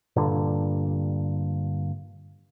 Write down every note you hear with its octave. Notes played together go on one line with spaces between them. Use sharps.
G2 A#2 D3